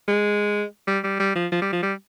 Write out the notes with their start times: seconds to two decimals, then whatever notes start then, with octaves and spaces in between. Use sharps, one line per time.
0.08 G#3
0.87 G3
1.04 G3
1.20 G3
1.36 F3
1.52 F3
1.62 G3
1.73 F3
1.83 G3